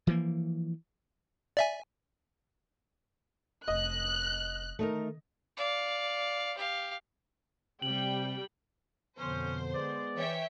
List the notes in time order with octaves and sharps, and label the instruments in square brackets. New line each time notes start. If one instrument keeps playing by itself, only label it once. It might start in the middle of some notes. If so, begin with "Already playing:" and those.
[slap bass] E3 F3 A#3
[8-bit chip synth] D5 E5 G#5
[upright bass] F1 [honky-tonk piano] D#5 [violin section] F#6
[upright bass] D3 D#3 [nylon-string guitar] A3 D#4 A#4
[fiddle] D5 F5
G4 F5
[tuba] C3 [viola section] G3 G5 [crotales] F#7
[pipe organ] F2 B2 [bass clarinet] D3 [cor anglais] C#4 [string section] C5
[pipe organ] G#3 B3 [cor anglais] D5
[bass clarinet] E3 [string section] C#5 E5 G5